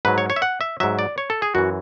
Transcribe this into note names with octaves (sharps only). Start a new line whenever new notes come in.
G#2 F#3 B4
C#5
C#5
E5
F#5
E5
G#2 F#3 E5
D5
C#5
A4
G#4
F#2 E3 F#4